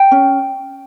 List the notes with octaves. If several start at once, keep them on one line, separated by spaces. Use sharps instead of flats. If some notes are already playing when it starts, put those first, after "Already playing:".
Already playing: G5
C#4